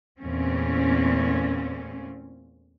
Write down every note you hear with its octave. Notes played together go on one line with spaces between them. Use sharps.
E2 A#2 A3 C4 C#4